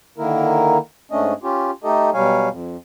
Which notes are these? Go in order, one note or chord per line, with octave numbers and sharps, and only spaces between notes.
D3 D#3 A#3 E4 A#4
G#2 A3 C#4 D4 D#5
C#4 F4 G4
A3 D#4 G4 A4 D#5
B2 F#3 G3 C#5 F5 G#5
F2